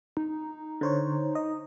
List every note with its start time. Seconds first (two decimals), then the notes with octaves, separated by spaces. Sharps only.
0.17 D#4
0.81 D3 C5 C#5
1.35 D#5